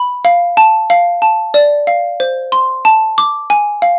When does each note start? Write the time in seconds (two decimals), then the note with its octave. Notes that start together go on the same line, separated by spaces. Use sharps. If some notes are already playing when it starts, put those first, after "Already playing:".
Already playing: B5
0.25 F5
0.57 A5
0.90 F5
1.22 A5
1.54 D5
1.87 F5
2.20 C5
2.52 C6
2.85 A5
3.18 D6
3.50 G#5
3.82 F5